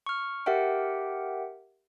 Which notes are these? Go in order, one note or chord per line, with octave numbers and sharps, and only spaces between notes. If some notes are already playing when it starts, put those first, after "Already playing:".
C#6 F6
G4 A#4 E5 F#5 G5